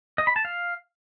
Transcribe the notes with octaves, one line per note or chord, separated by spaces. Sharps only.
D#5
B5
A5
F5